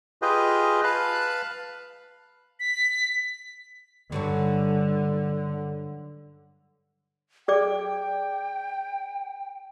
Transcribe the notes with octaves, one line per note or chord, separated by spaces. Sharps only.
F4 G4 G#4 B4 D#5 G5
B4 F5 A5 B5 F#6
B6
G2 D3 F#3 C#4
G#4 D5 G5 D6